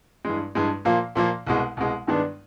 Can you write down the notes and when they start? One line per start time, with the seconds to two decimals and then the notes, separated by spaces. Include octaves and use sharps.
0.25 G2 E3 G#3
0.55 G2 E3 G#3
0.85 A#2 F3 A#3
1.16 A#2 F3 A#3
1.47 C2 B2 G#3
1.77 C2 B2 G#3
2.07 G2 D#3 G#3 B3 D4